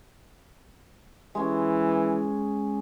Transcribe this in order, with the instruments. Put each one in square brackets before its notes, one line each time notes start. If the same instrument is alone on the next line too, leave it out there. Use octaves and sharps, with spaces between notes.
[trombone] E3 [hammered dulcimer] G#3 C#4